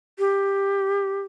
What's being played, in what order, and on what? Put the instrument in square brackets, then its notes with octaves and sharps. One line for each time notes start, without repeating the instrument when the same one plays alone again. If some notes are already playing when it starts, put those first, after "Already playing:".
[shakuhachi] G4